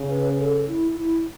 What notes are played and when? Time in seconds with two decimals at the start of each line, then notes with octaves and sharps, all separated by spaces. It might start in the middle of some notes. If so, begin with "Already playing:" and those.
Already playing: C#3
0.09 B4
0.39 A4
0.67 E4
0.96 E4